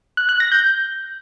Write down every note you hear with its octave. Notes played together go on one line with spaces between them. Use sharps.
F#6
F#6
A#6
G6